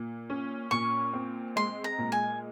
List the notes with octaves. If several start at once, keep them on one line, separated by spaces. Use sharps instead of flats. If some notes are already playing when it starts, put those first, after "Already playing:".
Already playing: A#2
C#4
A#2 C#6
C4
G#3 C6
A#5
A#2
G#5